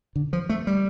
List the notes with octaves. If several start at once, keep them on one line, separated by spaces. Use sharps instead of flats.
D3
F3
A3
G3